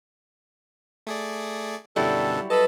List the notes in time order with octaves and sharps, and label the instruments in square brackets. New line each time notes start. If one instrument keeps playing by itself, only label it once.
[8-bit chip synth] A3 G#4 D5
[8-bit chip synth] F#2 B2 D3 [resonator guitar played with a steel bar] F#3 G3 E4 [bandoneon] A4
[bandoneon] A4 D#5 [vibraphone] B4 [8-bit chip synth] A5 B5